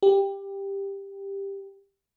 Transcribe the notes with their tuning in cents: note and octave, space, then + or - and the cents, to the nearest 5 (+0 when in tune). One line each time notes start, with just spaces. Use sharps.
G4 +10